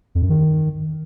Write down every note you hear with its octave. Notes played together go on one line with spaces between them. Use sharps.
F2
F#2
D#3